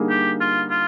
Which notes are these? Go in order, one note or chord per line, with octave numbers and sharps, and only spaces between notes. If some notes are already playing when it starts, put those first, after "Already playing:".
Already playing: D3 G3 A#3 D#4 G#4
G4
F4
F4